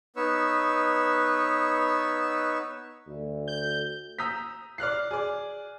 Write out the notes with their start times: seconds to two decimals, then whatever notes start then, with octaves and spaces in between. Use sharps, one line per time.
0.16 B3 D#4 B4 C#5 C#6 E6
3.07 D2
3.48 G6
4.19 A#5 D#6 E6 G6 B6
4.78 D5 F6 F#6 C7
5.11 G#4 D5